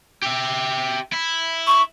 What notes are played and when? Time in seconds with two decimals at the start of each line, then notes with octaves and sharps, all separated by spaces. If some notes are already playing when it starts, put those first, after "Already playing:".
0.22 G4 E5
1.12 E4
1.67 C#6